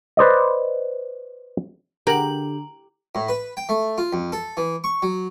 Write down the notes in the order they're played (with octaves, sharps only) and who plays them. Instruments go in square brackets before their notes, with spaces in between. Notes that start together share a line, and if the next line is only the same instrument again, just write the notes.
[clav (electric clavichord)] B4 C5 D5 D#5
[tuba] D3 [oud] G4 [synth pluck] G#4 A#4 F#5 [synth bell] A#5 F#7
[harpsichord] A2
B4
G5
A3
F4
F2
A4
E3
C#6
F#3